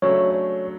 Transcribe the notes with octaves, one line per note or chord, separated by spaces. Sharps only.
C#3 F#3 A3 D4 A4 C#5
C#5